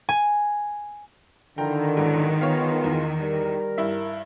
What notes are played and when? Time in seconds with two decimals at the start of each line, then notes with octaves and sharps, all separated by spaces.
0.09 G#5
1.58 D3 D#3 E4 F4 A#4 G5 A#5
1.97 C#2 G#2 B2 E3 F#3
2.41 G#3 B3 F4 C#5 F5
2.84 E2
3.21 G3 A#4
3.78 G2 E4 E5